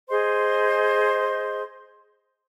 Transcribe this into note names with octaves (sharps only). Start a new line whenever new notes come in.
G#4 C5 D#5 C6